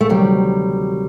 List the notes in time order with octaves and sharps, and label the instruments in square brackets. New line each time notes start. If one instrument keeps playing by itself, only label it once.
[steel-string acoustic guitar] A3
D2 C3 D#3 F#3 G3